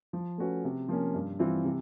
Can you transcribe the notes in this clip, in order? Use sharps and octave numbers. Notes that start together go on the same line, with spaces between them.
F3
A3 C#4 F#4 B4
C3
F3 A#3 C#4
G2
E3 G3 C4 F4
C3